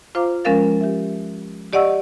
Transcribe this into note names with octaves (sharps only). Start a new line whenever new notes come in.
F4 C5 F5 A#5 D6
F3 G#3 C#4 A#4 F5 A6
G4 E5
G4 D5 D#5 F#5 C#6 E6